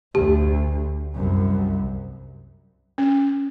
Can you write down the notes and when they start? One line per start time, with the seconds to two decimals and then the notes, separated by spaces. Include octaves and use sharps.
0.15 D2 G4
1.15 C2 F#2
2.98 C#4